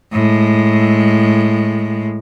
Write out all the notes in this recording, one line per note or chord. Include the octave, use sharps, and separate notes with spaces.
A2 G#3